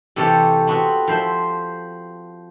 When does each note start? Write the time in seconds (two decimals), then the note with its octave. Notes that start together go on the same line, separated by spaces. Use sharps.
0.16 C3 E3 G4 A4 C#5
0.67 B3 C4 F#4 B4
1.08 F3 C5 E5